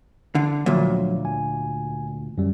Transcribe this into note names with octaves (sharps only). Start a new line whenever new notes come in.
D3
D2 A#2 F3 F#3
G#5
F#2 G3